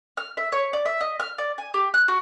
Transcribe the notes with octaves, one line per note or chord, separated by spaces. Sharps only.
F6
E5
C#5
D5
E5
D#5
F6
D5
G#5
G4
F#6
F#4